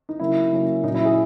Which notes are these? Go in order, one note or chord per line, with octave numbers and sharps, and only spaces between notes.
D#4
C#3 F#3 A#3 C#4 E4
C#3 F#3 A#3 C#4
A#2 F#3 C#4 D#4
E4
G#4